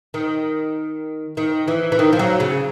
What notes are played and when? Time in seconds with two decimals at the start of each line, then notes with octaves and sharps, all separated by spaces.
0.14 D#3
1.37 D#3
1.68 E3
1.92 E3
1.99 D#3
2.13 F3
2.19 F#3
2.40 C#3